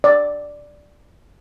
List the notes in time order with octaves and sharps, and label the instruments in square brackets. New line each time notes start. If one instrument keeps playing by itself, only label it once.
[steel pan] D5